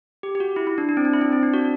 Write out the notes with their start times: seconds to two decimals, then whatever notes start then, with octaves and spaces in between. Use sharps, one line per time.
0.23 G4
0.35 G4
0.40 F#4
0.56 E4
0.67 E4
0.78 D4
0.89 D4
0.97 C4
1.05 D4
1.13 E4
1.21 C4
1.32 C4
1.43 D4
1.53 F#4